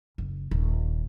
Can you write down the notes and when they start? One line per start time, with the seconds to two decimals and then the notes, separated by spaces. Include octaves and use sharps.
0.18 F#1
0.51 D#1